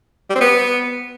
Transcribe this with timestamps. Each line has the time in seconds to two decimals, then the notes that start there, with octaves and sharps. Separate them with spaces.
0.30 G3
0.35 C4
0.40 B3